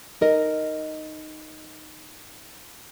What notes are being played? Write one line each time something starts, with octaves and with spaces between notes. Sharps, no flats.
D#4 A#4 D#5